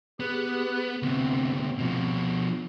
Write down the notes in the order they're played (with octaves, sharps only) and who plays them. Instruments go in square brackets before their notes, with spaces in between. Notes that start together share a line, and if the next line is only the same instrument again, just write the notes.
[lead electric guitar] B3 [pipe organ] G4 G#4 F#6
[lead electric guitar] D2 C3 [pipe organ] B3 C4
[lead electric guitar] B2 F3